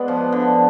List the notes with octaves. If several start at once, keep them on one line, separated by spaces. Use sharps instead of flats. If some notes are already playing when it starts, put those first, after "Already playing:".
Already playing: G#3 B3 D5
F3
D3